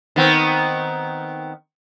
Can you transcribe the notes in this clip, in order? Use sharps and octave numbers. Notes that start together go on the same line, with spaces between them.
D#3 B3 C4